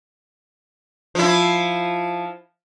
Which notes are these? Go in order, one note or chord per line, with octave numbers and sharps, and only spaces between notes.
F3 E4